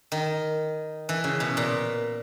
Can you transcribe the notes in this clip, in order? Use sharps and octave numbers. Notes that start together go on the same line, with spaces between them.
D#3
E3
C#3
B2
A#2